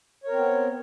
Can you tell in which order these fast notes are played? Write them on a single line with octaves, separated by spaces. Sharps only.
C#5 A#4 C4 B3